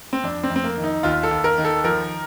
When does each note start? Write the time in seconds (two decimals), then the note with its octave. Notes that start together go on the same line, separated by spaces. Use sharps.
0.13 C4
0.23 F2 D4
0.43 C4
0.50 F2
0.56 C4
0.64 A#3
0.77 D#3
0.84 D#4
1.03 D#2 F4
1.23 A4
1.31 D#2
1.44 A#4
1.58 D#3
1.65 A4
1.84 F3 A#4